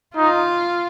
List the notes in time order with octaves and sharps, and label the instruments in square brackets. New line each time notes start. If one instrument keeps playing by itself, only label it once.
[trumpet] D#4 [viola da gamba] F4